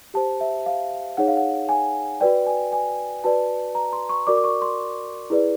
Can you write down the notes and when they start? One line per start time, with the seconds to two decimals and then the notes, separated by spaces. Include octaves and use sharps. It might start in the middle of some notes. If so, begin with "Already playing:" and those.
0.14 G4 C5 A5
0.41 E5
0.66 F5
1.17 D#4 G#4 C#5 F#5
1.28 F5
1.37 F#5
1.69 G#5
2.20 F#4 B4 D5 G5
2.47 G#5
2.73 G#5
3.24 F#4 B4 D5 A5
3.75 A#5
3.93 C6
4.09 C#6
4.27 F#4 A#4 D5 D6
4.37 D6
4.44 C#6
4.62 C6
5.30 E4 G#4 B4 D5